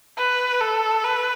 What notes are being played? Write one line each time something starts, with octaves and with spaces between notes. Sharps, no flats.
B4
A4
B4